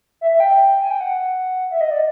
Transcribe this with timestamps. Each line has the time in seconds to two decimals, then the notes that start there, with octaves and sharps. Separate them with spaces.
0.21 E5
0.31 E5
0.40 G5
0.81 G#5
0.91 G5
1.01 F#5
1.71 E5
1.81 D#5
1.91 D5